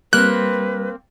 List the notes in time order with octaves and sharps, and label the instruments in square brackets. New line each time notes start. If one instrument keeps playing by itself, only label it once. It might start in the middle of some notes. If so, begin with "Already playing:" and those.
[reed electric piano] G3 [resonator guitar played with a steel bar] A#3 C4 [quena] B4 [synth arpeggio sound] F#6